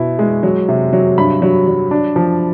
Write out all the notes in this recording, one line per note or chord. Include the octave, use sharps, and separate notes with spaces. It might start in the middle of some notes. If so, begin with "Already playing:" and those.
Already playing: B2 E4
G#3
F#3
C3
F#3
G2 B5
F#3
F#3
D4
F3